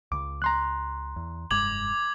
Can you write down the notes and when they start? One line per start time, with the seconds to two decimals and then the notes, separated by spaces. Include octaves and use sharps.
0.12 C#2 D6
0.42 A#5 C6 F#6
1.16 E2
1.51 F1 G2 G#3 D6 G#6 F#7